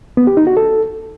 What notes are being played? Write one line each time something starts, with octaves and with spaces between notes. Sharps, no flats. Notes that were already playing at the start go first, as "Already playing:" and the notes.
B3
G4
D#4
F#4
A4